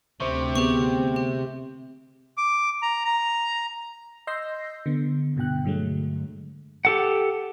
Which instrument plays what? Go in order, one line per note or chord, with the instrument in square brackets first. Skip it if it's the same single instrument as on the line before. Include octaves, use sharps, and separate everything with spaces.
[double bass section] D2 C4 [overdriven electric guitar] C3 [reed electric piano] C5 C6 C#6
[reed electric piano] B3 [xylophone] G4 G#4 C#6
[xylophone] G4
[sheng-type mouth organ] D6
A#5
A#5
[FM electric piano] D#5 C6 E6 G6 A#6 C7
D3 B3
G2 B2 D3 G5 F#6
G2 D3 F#3 G#3 A3
[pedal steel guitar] G4 A4 F#5